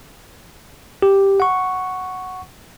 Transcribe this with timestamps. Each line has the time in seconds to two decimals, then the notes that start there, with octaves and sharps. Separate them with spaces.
1.02 G4
1.40 F#5 C#6